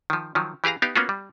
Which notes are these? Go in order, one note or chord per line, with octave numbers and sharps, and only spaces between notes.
D#3 F3
D#3 F3 F#3
E3 G4 G#4 F5 A#5
B3 D#4 G4 F5
A#3 B3 C#4 F4 F#4
G3